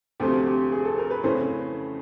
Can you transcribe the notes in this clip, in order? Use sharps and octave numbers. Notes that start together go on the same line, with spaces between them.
D2 C3 F3 A3 C4 G4
G4
G#4
A4
A#4
B4
F2 C#3 E3 A3 C#4 C5